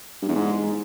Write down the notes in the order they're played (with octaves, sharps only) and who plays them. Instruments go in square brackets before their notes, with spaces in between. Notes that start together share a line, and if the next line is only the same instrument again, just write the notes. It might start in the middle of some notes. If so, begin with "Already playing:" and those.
[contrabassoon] G2
E2
G#2